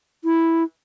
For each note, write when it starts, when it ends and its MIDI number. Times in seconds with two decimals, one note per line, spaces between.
0.24 0.64 64